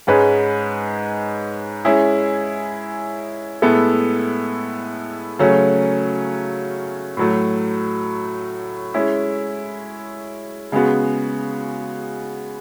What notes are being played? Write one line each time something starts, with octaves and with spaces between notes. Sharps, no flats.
G#2 G#3 C#4 G#4 B4
G#3 C#4 E4 G#4
A2 G#3 B3 E4 A4
C#3 F#3 A3 C#4
A2 F#3 A3
G#3 C#4 E4
C#3 G#3 B3 F#4